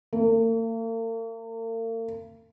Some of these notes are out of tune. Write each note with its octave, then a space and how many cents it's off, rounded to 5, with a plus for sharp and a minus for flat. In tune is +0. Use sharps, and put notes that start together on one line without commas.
A#3 -45